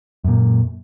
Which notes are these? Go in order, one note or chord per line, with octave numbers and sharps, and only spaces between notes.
F#2 A#2